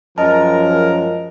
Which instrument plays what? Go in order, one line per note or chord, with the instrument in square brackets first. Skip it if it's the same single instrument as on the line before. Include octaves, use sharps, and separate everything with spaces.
[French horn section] F#2 C#4 [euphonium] F3 [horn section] G#3 A#4 [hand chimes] D#5 A5